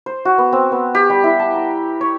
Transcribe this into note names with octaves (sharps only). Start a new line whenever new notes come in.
C5
F#4
B3
C4
B3
G4
G3
E4
A5
A#5
C#5